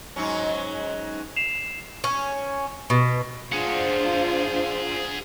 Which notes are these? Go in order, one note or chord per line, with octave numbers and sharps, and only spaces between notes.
G#2 F#3 C#4
C7 E7 F7
C#4
B2
D4 F4 G#4 C5 F#5